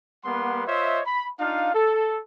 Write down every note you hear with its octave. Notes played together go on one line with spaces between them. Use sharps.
G3 A#3 B3 B4 F#5 C6
F4 C5 C#5 D#5 E5
B5
D4 D#4 F4 F5
A4